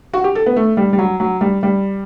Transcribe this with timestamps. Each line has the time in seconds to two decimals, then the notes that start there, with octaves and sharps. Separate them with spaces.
0.14 F#4
0.24 G4
0.35 A4
0.46 B3
0.56 A3
0.77 G3
0.93 G3
0.99 F#3
1.20 F#3
1.41 G3
1.63 G3